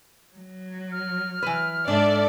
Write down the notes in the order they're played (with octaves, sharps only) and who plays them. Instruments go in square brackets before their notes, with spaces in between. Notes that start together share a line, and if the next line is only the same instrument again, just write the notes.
[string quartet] F#3
[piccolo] F6
[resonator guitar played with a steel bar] E3 B4
[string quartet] G#2 [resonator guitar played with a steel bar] D4 [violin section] A4 D5 E5